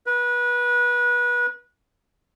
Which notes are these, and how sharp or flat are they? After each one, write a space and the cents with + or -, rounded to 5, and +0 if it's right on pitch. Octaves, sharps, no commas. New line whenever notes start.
B4 -25